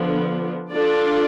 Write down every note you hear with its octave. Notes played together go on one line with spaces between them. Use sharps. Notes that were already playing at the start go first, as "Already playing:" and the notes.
Already playing: D3 F3 B3 D4
D4 F4 A4 D5